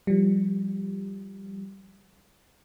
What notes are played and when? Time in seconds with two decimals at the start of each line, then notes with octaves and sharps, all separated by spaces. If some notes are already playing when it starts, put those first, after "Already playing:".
0.07 F3 G3